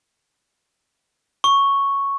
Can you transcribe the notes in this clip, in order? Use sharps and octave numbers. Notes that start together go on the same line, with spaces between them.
C#6